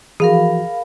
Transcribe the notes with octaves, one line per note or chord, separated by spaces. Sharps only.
E3 F3 F#4 G#4 A#4 F5 B5